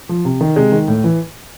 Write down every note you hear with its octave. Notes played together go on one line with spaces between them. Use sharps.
F3
C3
D#3
C3 G#3
D#3
A2
E3